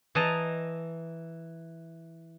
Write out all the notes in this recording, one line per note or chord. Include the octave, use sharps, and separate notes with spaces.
E3 D#5 A5 A#5